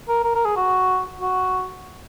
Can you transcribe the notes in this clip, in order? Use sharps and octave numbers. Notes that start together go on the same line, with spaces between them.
A#4
A#4
A#4
G#4
F#4
F#4